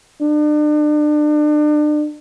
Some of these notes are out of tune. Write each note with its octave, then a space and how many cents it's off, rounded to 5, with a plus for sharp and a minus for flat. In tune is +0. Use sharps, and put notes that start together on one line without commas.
D4 +35